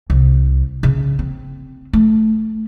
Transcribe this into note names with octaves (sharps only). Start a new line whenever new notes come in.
C2
C#3
C4
A3